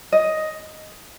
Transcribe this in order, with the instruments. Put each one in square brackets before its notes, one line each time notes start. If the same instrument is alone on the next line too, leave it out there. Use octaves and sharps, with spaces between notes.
[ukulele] D#5